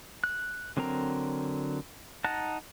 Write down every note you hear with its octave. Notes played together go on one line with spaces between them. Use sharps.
F#6
D3 F#3 C4 A#4 A#5
D#4 F#5 A5 A#5 F#6